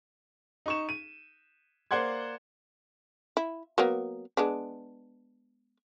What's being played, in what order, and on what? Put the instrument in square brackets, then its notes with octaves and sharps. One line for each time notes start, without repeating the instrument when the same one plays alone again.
[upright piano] D#4 C#6 E7
D#7
A#3 C5 D5 F#5 C6 G#6
[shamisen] E4
F#3 A#3 B3
G#3 B3 D4